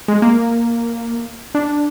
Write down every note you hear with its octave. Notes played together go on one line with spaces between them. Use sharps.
G#3
A#3
D4